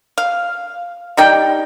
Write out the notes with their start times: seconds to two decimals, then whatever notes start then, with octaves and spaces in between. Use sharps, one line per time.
0.18 F5
1.17 G3 D#4 G5